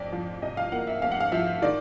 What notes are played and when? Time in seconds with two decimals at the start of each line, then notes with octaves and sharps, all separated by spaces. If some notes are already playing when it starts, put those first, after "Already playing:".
Already playing: F2 D5
0.12 F3
0.42 C3 D#5
0.57 F5
0.72 A#3 F#5
0.87 E5
1.02 F2 F5
1.12 F#5
1.20 F5
1.32 F3 E5
1.62 D#3 D5